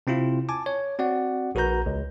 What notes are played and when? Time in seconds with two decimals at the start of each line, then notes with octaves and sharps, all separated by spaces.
0.07 C3 C4 E4 F4
0.49 G#5 A5 D6
0.66 C#5
0.99 C4 F#4 D5 F#5
1.55 A#1 F#4 A#4 B4 A#5 G6
1.86 C#2